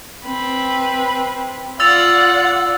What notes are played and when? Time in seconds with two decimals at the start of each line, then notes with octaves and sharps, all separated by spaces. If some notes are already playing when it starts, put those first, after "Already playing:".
0.25 C4 B4
1.80 F4 D5 F#5 E6 A6 F7